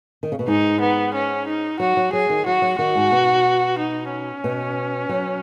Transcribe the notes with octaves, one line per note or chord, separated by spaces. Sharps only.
D#3
C#3
B2
G#2 D#4
B3
C#4
D#4
F#3 F#4
F#3
F#3 G#4
D#3
F#3 F#4
F#3
D#3 F#4
G#2
B2
D#4
C#4
B2
F#3